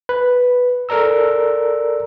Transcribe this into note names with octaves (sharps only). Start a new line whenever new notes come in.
B4
A4 A#4 D5 A#5 E6